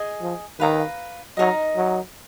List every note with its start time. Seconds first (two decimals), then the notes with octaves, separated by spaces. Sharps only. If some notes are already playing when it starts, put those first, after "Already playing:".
Already playing: G#4 D#5 G#5
0.21 F3
0.60 D#3 B4 F5 A#5
1.37 F#3 D#4 A#4 D#5
1.76 F#3